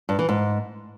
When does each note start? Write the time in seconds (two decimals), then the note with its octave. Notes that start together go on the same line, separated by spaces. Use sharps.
0.09 G2
0.19 E3
0.29 G#2